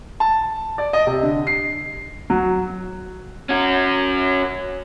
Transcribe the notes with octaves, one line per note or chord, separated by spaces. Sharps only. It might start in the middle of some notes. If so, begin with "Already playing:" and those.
A5
D5
D#5
C3
D3
C7
F#3
C#4 F#4